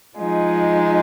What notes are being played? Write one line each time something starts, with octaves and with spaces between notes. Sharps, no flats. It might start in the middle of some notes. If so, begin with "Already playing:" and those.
F3 G#3 D#4